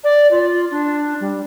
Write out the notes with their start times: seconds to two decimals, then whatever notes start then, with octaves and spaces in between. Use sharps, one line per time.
0.03 D5
0.31 F4
0.71 D4
1.20 G3